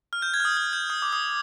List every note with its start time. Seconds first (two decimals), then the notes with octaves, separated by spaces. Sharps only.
0.13 F6
0.22 G6
0.34 G#6
0.40 F6
0.45 D#6
0.57 F6
0.73 G6
0.90 D#6
1.02 D6
1.13 D#6